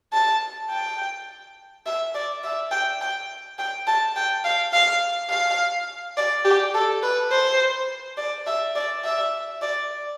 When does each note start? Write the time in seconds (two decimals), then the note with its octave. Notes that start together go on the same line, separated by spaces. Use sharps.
0.13 A5
0.70 G5
1.86 E5
2.14 D5
2.43 E5
2.71 G5
3.01 G5
3.59 G5
3.87 A5
4.16 G5
4.45 F5
4.73 F5
5.30 F5
6.17 D5
6.45 G4
6.74 A4
7.03 B4
7.31 C5
8.17 D5
8.47 E5
8.75 D5
9.04 E5
9.62 D5